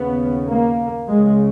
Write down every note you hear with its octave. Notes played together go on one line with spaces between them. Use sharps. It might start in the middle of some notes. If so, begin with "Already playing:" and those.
Already playing: D#2 C#3 B3
A#3
C#2 C#3 G#3